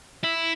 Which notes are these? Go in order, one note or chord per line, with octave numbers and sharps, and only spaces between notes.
E4